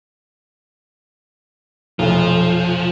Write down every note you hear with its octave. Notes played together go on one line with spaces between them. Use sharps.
F1 B1 F3